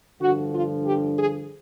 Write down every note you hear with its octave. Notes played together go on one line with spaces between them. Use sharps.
G2 D3 F3 F#4
F4
G4
G#4